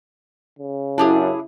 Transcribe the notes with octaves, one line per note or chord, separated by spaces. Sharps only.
C#3
F#2 D4 E4 G4 G#4